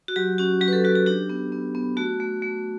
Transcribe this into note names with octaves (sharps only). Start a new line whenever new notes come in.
F#4
F#3 G4
C#4 F#4
F#3 G4
B4
A4
F#3 F#4
G4
D4 G4
B3
B3
B3
A3 F#4
A3
A3